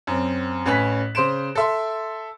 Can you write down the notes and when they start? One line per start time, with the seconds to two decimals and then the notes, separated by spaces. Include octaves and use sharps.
0.07 F#2 C4
0.66 A1 C#4 B4 G#5 F#6 B6
1.15 C#3 C5 C6 D7 E7
1.55 A4 E5 C6